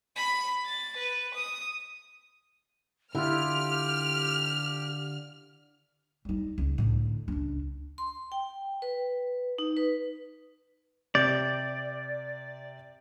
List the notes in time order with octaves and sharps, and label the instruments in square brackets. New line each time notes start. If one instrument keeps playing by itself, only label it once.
[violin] B5
A6
B4
D#6
[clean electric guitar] D3 F4 [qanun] E4 [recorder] G4 [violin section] F6
[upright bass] G3 D#4
C#2
A2 D3
C#2 D4
[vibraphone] C6
G5
B4
D#4
B4
[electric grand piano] C3 G6 [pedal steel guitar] D5